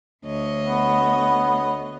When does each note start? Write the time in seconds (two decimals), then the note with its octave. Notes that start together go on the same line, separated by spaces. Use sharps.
0.25 D2 C#5 D#5
0.65 B3